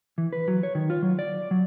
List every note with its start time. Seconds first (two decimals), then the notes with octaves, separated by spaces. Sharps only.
0.18 E3
0.33 B4
0.48 F#3
0.63 C#5
0.75 D#3
0.90 F4
1.02 F#3
1.19 D5
1.51 F#3